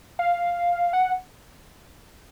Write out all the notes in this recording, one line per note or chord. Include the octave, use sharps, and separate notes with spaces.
F5
F#5